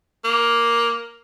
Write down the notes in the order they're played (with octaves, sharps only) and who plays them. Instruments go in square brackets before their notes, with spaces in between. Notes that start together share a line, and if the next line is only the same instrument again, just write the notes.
[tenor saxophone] A#3